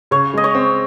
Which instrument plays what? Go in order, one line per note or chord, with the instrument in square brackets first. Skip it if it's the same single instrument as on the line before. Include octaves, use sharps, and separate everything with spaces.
[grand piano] C#3 [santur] C#5
[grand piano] G#3 [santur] D#5
[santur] C#5
[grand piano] C4